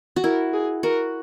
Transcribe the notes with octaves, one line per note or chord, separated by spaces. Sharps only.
F#4
E4 A#4
G#4
F#4 A#4